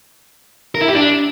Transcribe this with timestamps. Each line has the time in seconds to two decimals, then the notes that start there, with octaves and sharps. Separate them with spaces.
0.75 A#4
0.81 E4
0.88 G4
0.95 D4